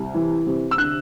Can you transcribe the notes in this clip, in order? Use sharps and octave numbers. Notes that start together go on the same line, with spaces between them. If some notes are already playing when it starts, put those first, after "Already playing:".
Already playing: C2
E3
C3
E6
D3 F#6